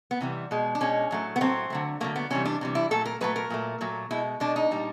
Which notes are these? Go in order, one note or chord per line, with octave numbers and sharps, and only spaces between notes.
B3
C3 E3 G3
B2 G#3
D4
B2 G#3 C#4
A2 F#3 A3
B3
A2 F#3 A3 C4
D3 F#3 A3
D3 F#3 A3 A#3
B3
C3 E3 G3 C#4
D4
C3 E3 G3
E4
A#2 F#3 A3 A4
A#4
A#2 F#3 A3 B4
A#4
A#2 F#3 A3
A#2 F#3 A3
B2 G#3 E4
B2 G#3 D4
D#4
A#2 G3